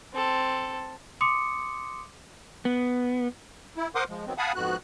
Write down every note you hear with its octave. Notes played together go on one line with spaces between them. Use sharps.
C4 A4
C6 D6 D#6 C#7
B3
E4
A#4 C5 F#5 C6 D6 D#6
F3 G#3
D#3 F#3 B3 C4
F5 F#5 G#5 A5 B5 D#6
F2 G#2 B3 F#4 F#6